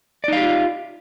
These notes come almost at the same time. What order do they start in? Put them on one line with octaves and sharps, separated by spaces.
D5 D#4 F5 G4 F4